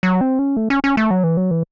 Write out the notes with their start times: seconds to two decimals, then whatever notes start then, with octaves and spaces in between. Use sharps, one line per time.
0.03 F#3
0.21 C4
0.39 C#4
0.57 A3
0.70 C#4
0.84 C#4
0.97 A3
1.11 F#3
1.23 E3
1.37 F#3
1.51 E3